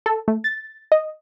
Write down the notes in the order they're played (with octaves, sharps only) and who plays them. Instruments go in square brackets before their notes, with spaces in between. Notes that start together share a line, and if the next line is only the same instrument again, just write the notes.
[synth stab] A4
A3
A6
D#5